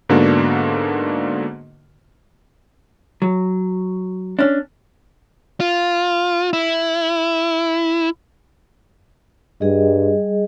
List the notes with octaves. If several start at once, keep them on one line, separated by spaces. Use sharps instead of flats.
G#2 D3 A#3 B3 D4 F#4
F#3
C#4 D4
F4
E4
G2 G3 G#4 D#5